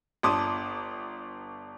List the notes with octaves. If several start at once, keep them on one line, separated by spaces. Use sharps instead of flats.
G1 D4 A5 C6 D6 D#6